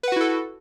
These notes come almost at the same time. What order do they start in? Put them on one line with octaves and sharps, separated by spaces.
B4 F#5 F#4 E4 A4